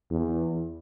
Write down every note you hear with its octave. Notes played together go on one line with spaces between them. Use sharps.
E2